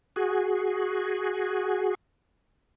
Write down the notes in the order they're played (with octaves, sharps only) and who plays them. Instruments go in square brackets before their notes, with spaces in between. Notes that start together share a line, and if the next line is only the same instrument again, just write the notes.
[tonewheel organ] F#4 G#4